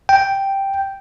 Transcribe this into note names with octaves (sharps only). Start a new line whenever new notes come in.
G5